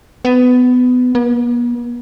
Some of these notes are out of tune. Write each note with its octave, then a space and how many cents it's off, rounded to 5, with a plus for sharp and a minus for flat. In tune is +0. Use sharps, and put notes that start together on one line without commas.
B3 +20
B3 -45